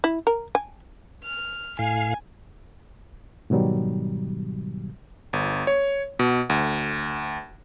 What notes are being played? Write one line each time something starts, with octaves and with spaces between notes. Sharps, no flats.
E4
A#4
G#5
F6
A2 F5 G#5
G#2 B2 D#3 F#3 G3
G1
C#5
B2
D2